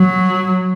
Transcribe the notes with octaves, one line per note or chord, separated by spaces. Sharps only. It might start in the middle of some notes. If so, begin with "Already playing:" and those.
Already playing: F#3